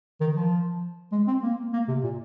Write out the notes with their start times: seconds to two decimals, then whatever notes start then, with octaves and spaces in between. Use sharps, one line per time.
0.20 D#3
0.36 F3
1.12 G#3
1.27 C4
1.42 A#3
1.73 A#3
1.88 C3
2.03 A#2